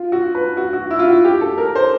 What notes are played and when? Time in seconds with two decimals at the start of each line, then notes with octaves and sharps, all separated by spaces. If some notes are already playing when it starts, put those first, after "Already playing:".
Already playing: F4
0.12 F#4
0.35 B4
0.57 F#4
0.73 F#4
0.91 E4
0.99 F4
1.08 F#4
1.24 G4
1.41 A4
1.58 A#4
1.75 C5